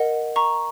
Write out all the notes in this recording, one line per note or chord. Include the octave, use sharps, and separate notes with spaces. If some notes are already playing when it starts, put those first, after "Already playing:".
Already playing: A#4 D#5 F#5
A#5 C#6